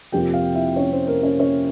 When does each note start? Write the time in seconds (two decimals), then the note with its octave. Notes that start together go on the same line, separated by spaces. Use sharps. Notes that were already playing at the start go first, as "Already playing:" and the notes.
0.12 F2 C3 F3 A#3 G4 G5
0.33 F4 F5
0.55 E4 E5
0.76 C#4 C#5
0.92 C4 C5
1.08 A#3 A#4
1.23 C#4 C#5
1.39 C#4 C#5